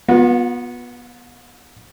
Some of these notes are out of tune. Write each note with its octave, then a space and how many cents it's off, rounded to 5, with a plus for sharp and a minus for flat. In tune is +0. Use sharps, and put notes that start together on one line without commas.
B3 -20 F4 +40